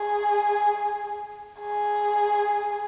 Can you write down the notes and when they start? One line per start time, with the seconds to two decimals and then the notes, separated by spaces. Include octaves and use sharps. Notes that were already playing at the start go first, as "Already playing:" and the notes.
Already playing: G#4
1.60 G#4